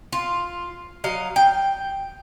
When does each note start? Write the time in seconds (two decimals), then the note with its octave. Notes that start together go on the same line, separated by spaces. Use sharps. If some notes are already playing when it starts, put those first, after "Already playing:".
0.12 F4
1.04 F#3 D#5 F5
1.36 G5